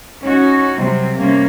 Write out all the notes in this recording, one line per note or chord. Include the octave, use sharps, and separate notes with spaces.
C#4 D#4 F#4
C3 F#3 G3 C4
C3 G3 A#3 C#4